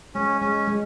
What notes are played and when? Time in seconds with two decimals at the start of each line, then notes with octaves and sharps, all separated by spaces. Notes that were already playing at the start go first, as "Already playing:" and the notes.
0.15 G#3 C#4
0.41 G#3 C#4
0.68 G#3